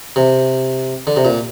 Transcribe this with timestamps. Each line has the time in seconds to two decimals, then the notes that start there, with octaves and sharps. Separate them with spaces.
0.16 C3
1.07 D3
1.16 C3
1.25 A#2